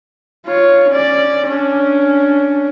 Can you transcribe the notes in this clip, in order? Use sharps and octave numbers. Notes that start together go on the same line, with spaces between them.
F4 C#5
C#4 D5
C#4 D4